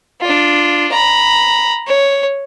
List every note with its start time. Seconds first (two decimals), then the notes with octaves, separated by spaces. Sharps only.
0.21 D4 F4
0.91 A#5 B5
1.87 C#5